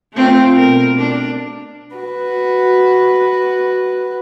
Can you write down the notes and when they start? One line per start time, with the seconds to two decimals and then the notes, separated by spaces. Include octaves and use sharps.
0.13 A3 C4 F4
0.54 B2 A#4
0.97 D4
1.96 F#4 B4